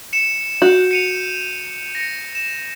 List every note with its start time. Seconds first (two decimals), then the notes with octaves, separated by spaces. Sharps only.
0.13 C#7 E7
0.62 F#4 G6
0.91 C#7 D#7 F7
1.95 A#6 C#7
2.35 E7